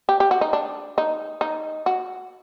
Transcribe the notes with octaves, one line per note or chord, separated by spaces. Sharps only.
G4
G4
F#4
D#4
D4
D#4
D#4
F#4